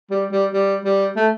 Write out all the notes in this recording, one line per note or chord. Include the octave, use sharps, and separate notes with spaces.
G3
G3
G3
G3
A3